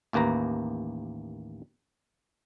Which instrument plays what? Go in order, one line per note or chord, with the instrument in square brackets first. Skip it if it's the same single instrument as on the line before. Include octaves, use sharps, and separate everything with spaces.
[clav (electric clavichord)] A1 D#2 A#3 B4 A#5